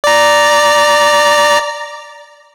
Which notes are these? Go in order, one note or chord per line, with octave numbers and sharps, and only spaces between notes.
D5 A#5